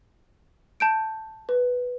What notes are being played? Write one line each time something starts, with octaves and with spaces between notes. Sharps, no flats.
A5 G6 D7
B4